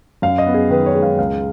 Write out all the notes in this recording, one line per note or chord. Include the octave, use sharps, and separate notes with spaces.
F#2 F5
D#5
B3
G#4
D#3 B4
C#5
G#3
F5
C#2 F5